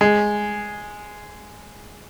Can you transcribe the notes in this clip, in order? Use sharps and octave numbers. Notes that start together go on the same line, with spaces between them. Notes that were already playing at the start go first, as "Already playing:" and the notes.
G#3